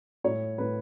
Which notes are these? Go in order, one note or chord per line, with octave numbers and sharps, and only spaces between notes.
A2 C#5
A2 B4